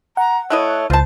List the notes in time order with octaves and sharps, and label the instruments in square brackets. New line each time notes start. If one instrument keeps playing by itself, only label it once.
[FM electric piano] F#5 [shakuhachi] A#5
[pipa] A3 E4 D#5 [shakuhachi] C#5 [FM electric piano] F#6
[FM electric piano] C#2 [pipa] F4 A5 [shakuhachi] C5